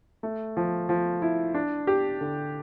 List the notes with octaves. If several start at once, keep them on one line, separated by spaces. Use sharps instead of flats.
A3
F3
F3
E4
D4
G4
D3